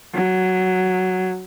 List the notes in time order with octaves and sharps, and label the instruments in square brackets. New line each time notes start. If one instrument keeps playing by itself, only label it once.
[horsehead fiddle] F#3